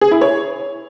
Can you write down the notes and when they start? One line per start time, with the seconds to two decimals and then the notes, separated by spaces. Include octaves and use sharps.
0.01 G#4
0.11 E4
0.21 C#5